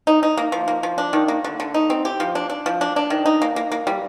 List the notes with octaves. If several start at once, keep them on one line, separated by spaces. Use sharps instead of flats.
D#4
D#4
A#3
F3
A#3
F3
D4
D#3
A#3
D3
D3
D#4
C4
G4
F3
D4
D4
F3
D4
D4
D#3
D#4
A#3
A#3
A#3
G3